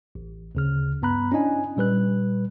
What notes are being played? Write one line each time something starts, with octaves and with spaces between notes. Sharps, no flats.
A1
D2 C#3 F6
G2 B3 A#5 B5 F#6
C#4 D4 E4 D#5 G#5
A#2 G3 B4 F#6